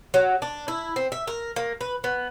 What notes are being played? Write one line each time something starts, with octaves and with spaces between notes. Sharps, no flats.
F#3
D4
E4
C4
E5
A#4
A#3
B4
B3